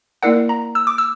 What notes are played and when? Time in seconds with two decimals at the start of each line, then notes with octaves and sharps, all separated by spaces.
0.23 A#3 E4 A#4 D5 F#5
0.49 A#5
0.75 E6
0.87 D6
0.98 E6